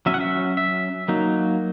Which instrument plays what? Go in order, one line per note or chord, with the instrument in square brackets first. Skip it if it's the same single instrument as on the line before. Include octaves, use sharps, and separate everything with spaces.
[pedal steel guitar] F#3 C#4 E5
F#5
E5
E5
F#3 A#3 D#4